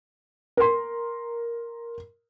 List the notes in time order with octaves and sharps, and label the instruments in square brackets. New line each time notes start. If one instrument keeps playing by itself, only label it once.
[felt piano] A#4 C6